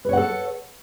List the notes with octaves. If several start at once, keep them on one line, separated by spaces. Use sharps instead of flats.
A4 B4 C#5 F#5